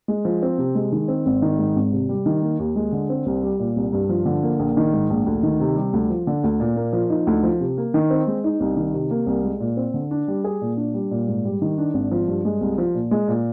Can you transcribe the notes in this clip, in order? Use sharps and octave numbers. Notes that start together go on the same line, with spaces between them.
G#3
F3
C4
C3
G#3
D#3
C4
G#1
D#3
G#2
G#1
C3
G3
D#3
A#3
D#2
G#3
D3
C4
C2
G3
A#2
C2
G2
F3
D3
A#3
A#1
D#3
G#2
A#1
D2
D#3
C3
G3
D2
F3
D3
D2
A#2
A#3
F3
D#4
D2
F3
C3
A#3
D#3
C4
G#3
D#4
C2
D#3
C3
A#3
C2
G#3
A#2
C4
D3
D4
G3
G#4
A#2
D4
G3
A#2
G#2
G3
D#3
D4
G#1
F3
G2
G#3
C2
F3
A#2
G#3
A#2